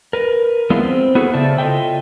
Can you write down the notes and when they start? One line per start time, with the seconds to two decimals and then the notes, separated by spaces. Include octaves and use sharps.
0.13 A#4 B4
0.70 F3 G#3 B3 D4 E4 F4
0.82 C4
1.15 B3 E4 F#4 G#4 A4
1.34 C#3 C5 D5 E5 A5
1.58 F4 A4 D#5 E5 G5